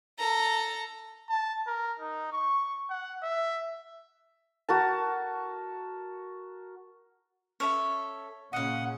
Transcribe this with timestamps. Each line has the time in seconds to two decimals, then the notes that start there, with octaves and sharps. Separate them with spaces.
0.19 A4 A#5
1.29 A5
1.67 A#4
1.99 D#4
2.33 C#6
2.90 F#5
3.23 E5
4.69 F#4 A#4 A5
7.60 C#4 A4 C#5 E5
8.53 A#2 C#3 C#4 D#5 F5 F#5